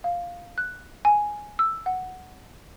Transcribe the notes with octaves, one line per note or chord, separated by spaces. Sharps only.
F5
F#6
G#5
E6
F#5